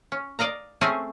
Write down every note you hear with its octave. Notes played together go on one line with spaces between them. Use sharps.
C#4
D5 D#5 F5 A#5
A3 C4 C#4 G#4 G#5